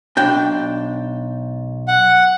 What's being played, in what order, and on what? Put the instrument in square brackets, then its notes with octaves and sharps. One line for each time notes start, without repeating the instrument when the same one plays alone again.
[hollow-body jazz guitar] B1 D4 G5
[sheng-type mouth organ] F#5